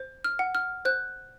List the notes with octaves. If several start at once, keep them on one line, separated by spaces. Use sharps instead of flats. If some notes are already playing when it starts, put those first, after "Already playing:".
Already playing: C5
F6
F#5
F6
C5 F#6